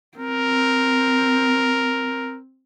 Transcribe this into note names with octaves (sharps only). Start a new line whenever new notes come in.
C4 A#4